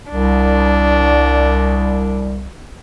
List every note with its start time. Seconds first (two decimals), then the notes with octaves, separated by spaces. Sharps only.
0.12 C2 D4